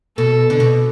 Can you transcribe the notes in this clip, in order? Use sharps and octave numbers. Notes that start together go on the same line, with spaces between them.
B2 A4
D3
B2